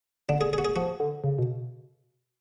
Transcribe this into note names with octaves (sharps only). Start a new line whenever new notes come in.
D3 D4
G#4
G#4
F#4
G#4
F3 F#4
D3
C#3
B2